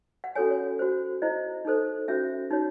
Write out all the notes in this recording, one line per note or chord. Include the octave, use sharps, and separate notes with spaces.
F#5
C#4 F#4 A4 C#5 G#5
C#5
F#4 C5
E4 C5 D#5
D#4 A4 C5
C#4 F#4 C5 E5
D#4 F#4 C#5